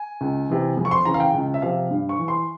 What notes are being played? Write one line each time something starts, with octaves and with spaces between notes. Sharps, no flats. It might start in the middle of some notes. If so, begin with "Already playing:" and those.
Already playing: G#5
C#2
C3 E3
F2
C#6
C6
C#3 E3 A#5
F5
G5
C#2
E5
C3 F3 F5
G2
C#6
E3
C6